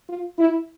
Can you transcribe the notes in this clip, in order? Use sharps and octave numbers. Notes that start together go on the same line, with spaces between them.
F4
E4